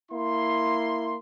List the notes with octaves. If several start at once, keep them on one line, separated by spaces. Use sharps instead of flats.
A#3 E4 C6